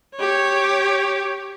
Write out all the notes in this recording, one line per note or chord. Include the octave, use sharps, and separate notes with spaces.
G4 C#5